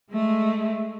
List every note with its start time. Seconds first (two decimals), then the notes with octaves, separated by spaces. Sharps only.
0.11 G#3 A3